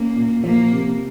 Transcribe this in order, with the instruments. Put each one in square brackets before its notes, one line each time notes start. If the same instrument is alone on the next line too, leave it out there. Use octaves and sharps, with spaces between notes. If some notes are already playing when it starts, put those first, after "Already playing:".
Already playing: [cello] A#3 [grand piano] C#4
[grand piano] A#2
[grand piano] F3 [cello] A#3
[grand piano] C3